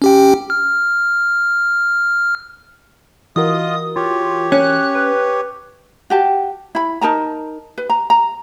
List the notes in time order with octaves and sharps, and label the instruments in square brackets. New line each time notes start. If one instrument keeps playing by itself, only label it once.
[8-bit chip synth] C#4 G4 G5
F6
[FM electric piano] E3 F#4 A#4 [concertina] F4 D#5 [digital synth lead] D#6
[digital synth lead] F4 [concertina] G4 C#5
[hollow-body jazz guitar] C#4 [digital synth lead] F#6
[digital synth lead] B4
[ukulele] F#4 G4 A5
E4 B5
D#4 A#4 A5 A#5
B4
A#5
A#5